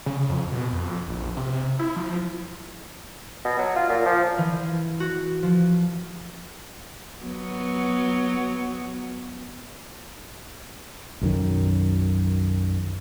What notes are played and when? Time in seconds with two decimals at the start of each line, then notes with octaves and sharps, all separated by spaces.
0.06 C#3
0.29 F2
0.52 B2
0.72 F2
1.07 A#1
1.37 C3
1.79 E4
1.96 F3
3.45 B2
3.58 F#3
3.76 F4
3.89 A#2
4.06 F3
4.38 E3
5.00 F#4
5.43 F3
7.23 F#3 B3
11.21 B1 F#2 D#3